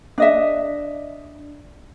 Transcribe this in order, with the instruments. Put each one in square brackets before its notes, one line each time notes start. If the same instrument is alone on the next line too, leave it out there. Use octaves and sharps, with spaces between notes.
[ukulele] D4 D#5 E5